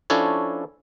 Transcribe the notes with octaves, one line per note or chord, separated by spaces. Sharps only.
F3 C#4 D4 E4 A4 C#5